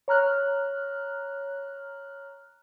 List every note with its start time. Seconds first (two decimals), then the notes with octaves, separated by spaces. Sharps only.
0.08 C#5 A#5 F6 F#6